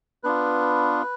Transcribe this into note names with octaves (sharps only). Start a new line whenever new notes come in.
B3 D4 F4 B4